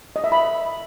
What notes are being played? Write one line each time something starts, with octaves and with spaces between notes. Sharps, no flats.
D#5
E5
B5